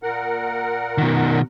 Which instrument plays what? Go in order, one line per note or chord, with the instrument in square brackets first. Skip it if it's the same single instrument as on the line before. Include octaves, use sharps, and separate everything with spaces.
[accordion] A#2 A#4 F#5
[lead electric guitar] B2 D#3